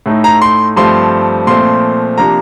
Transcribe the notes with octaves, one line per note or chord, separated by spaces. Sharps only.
A2 A3 D#4
A#5
C6
G2 F3 A3 C4 C6
A#2 F3 A3 C4 C6
C3 F3 A#3 D4 A#5